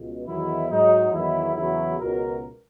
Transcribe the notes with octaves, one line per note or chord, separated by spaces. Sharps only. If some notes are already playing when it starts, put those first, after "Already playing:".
Already playing: C#2 B2
E2 D#3 F#3 E4
G#2 F#3 D#4
E2 D#3 F#3 E4
E2 C#3 F#3 E4
C#2 B2 F#3 A#4